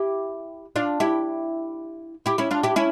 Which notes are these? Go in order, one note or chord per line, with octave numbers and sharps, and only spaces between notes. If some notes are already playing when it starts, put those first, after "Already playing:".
Already playing: E4 G4
D4 F4
E4 G4
E4 G4
C#4 E4
D4 F4
E4 G4
C#4 E4